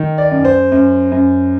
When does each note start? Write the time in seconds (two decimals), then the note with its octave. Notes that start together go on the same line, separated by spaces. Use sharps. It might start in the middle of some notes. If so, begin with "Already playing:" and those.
Already playing: D#3
0.18 D5
0.31 F#2
0.45 C5
0.72 F#2
1.12 F#2